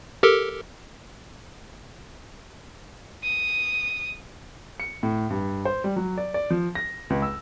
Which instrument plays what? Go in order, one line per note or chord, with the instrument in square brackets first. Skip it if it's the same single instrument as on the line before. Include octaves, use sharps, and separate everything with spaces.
[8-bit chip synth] G4 A4 A#4
[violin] D#6
[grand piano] C#7
A2
G2
C5
G3
F#3
D5
D5
F3
A#6
C#2
E6